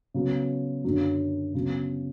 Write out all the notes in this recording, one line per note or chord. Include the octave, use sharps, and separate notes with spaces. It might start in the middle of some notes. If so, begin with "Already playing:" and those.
C#3 F#3 B3
F#2 D3 F#3
C#3 F#3 B3